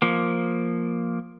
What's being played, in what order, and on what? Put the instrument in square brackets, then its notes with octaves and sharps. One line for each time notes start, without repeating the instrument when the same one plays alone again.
[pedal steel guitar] F3 A#3